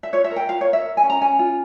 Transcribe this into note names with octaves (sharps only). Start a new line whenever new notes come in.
E5
F4 C#5
E5
A#4
G5
F4 F5
C#5
A#4
E5
A#4
G#5
C#4
A#5
C#4 G#5
F4